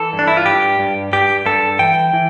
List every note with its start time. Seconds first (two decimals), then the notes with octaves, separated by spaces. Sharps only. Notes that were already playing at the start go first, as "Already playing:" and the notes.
Already playing: E3 A4
0.13 G2
0.19 D4
0.28 E4
0.37 F4
0.46 G2 G4
0.79 G2
1.13 G2 G4
1.46 G2 A4
1.79 E3 G5
2.14 E3